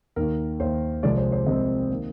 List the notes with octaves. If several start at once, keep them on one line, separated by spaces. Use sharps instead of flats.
D#2 D#3 A#3 A#4
D#2 D#3 A#3 C5
C2 C3 F3 G#3 C4 D5
C5
C5
C2 C3 F3 G#3 C4 D#5
D#3 A#3